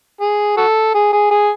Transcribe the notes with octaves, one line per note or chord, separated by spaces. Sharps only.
G#4
F#4 A4
G#4
G#4
G#4